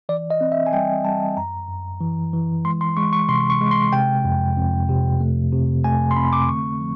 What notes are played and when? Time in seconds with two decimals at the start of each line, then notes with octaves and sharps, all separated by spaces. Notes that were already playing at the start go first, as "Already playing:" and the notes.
0.09 E3 D5
0.30 D#5
0.41 C4
0.52 E5
0.66 G#5
0.73 G3 G5
1.04 G3 A5
1.37 F#2 A#5
1.69 F#2
2.01 E3
2.33 E3
2.65 G#3 C6
2.81 C6
2.97 G#3 C#6
3.13 C#6
3.28 C3 C6
3.50 C#6
3.61 G#3
3.71 C6
3.93 C3 G5
4.25 F2
4.57 F2
4.89 C3
5.21 A3
5.53 C3
5.84 A3 G#5
6.11 C6
6.16 C4 B5
6.33 D6
6.48 D3 C#6
6.81 F3